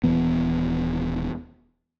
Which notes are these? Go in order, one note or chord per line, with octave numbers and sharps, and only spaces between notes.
D#1 E3 B3